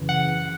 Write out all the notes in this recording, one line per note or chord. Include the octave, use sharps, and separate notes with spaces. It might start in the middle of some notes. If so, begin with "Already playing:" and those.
Already playing: F#2 C#3 E3
F#5